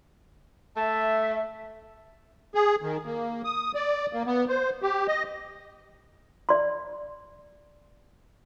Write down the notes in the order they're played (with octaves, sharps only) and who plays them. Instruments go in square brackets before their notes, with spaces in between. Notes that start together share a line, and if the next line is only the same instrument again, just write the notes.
[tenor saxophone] A3 [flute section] E5 [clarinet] A5
[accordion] G#4
D#3
A#3
D#6
D5
A#3
B3
C5
G4
D#5
[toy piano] D5 C6